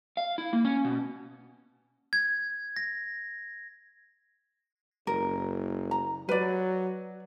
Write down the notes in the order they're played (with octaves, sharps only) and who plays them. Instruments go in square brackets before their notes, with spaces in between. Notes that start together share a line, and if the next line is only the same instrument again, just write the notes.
[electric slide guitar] F5
E4
A#3
C#4
B2
[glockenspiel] G#6
A#6
[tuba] F#1 [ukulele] A#4
[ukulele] A#5
[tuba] F#3 [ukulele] B4 D5